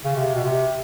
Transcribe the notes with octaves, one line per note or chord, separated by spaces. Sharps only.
C#3
C3
B2
C3